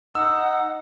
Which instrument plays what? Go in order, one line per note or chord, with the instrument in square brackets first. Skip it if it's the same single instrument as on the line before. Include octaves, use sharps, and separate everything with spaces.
[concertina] D#4 [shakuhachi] F#5 [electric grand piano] E6